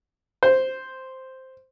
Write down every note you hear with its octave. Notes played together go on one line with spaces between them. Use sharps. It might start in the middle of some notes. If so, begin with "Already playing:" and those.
C5